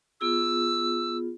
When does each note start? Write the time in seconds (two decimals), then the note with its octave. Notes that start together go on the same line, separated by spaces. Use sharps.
0.21 B3 F4 G#4 E6